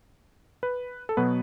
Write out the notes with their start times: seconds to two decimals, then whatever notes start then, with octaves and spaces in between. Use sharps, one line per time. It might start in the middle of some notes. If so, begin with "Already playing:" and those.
0.63 B4
1.09 A4
1.17 B2 F#3 B3 B4